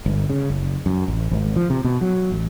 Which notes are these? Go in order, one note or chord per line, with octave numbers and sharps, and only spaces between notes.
G1
C#3
F#1
F#2
A1
G#1
F3
C3
B2
F#3
A1